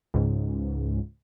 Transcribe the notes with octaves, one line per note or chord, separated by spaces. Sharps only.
C#2 G#2